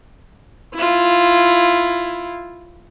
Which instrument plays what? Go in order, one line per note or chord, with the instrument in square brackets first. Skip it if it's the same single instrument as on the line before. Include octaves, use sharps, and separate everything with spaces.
[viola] E4 F4